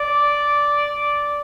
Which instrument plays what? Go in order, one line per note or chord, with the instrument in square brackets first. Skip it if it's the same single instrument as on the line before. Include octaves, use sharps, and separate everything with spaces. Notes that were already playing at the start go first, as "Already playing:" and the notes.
Already playing: [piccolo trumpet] D5